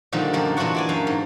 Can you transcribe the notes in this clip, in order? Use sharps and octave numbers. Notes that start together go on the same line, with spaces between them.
A#2 D3 D#3 F3 G3
F#2 F3 G3 D4
A#2 E3 D4 F4 F#4 F#5
E4 D5 G#5
F#2 F5
G#2